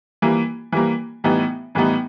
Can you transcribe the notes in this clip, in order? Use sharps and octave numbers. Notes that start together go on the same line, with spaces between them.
E3 G3 A#3
E3 G3 A#3
A2 E3 G3 B3 D#4
A2 E3 G3 B3 D#4